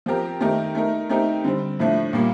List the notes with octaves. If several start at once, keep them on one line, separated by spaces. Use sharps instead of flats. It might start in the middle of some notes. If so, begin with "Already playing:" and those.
F3 C4 G4 A#4
D#3 A3 D#4 G4 A#4
A3 D#4 A#4
A3 C4 D#4 G4 A#4
D3 G3 C4
A2 F3 A3 D4
A#2 G3 A#3